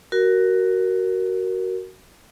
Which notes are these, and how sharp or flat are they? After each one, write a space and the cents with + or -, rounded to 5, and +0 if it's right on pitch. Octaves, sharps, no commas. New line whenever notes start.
F#4 +15 A#4 +0